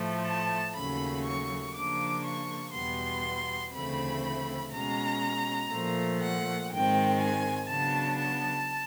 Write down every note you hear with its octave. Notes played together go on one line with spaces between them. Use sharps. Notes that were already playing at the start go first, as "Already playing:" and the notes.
Already playing: A2 F3 A3
A5
D#2 C#3 F#3 A3 C#4 B5
C#6
C#3 F3 A#3 D4 D6
C#6
E2 B2 G3 B3 C6
D2 C#3 E3 A3 C4 B5
B2 G#3 C#4 A#5
A#2 F3 A3
F#5
G#2 D#3 G#3 C4 G5
G#5
C#3 F#3 B3 D4 A5
A5